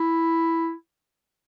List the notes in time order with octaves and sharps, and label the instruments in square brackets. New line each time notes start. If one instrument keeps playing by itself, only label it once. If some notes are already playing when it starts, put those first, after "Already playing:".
Already playing: [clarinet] E4